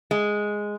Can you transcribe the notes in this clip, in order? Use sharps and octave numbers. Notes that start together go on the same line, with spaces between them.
G#3